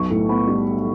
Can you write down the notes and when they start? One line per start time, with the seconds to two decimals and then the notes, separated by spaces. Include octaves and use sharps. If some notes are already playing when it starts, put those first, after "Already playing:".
Already playing: B1 C#6
0.10 A2
0.29 B3 B5
0.47 G3